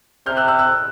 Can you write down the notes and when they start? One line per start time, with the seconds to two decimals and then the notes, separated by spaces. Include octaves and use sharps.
0.26 C3 F6 G6
0.37 E6 F#6
0.48 E6 F#6
0.59 E6 F#6